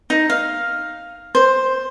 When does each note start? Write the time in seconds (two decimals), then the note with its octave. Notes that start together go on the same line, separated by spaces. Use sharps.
0.10 D#4
0.30 F5
1.35 C5